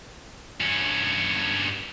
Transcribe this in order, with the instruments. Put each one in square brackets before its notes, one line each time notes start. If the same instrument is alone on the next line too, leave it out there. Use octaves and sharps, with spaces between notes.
[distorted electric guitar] G2 C#4